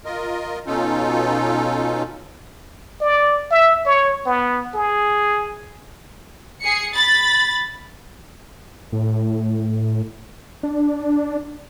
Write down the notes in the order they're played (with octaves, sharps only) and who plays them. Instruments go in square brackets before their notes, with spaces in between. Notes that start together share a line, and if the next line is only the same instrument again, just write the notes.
[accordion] F4 A#4 D#5
B2 C#4 D#4 F4 A4
[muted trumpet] D5
E5
C#5
B3
G#4
[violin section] G#4 C7 C#7
B5 A6
[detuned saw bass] A2
D4